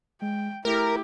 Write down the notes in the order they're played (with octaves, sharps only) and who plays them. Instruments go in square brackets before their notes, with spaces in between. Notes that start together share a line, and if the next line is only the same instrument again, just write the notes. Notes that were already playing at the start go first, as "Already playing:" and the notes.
[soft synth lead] G#3 [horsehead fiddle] G5
[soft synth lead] A3 [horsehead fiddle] E4 G4 [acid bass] A#4